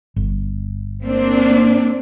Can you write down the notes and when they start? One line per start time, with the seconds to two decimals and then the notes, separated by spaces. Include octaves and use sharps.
0.16 G1
1.04 A#3 C4 D4